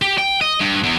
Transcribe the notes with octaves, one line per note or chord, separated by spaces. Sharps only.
G4
G5
D#5
G2
E2